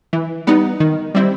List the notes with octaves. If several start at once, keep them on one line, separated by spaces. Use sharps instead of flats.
E3
G3 B3 D#4
D#3
G3 C4 E4